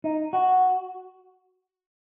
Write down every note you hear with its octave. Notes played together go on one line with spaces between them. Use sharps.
D#4
F#4